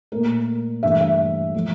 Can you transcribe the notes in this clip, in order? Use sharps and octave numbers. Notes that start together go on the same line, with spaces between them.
A#2 A3 A#4
G2 E3 A3 E5
E5
F3 A3